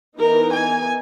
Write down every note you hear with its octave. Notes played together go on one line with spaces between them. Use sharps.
E3 B3 D#4 A#4
G#5